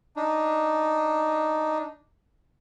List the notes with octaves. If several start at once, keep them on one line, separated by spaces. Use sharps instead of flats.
D4 D#4